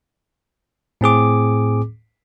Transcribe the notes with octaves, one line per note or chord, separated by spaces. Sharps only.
A2 C4 G#4 D6